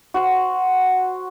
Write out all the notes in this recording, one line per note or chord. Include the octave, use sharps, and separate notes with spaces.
F#4 C5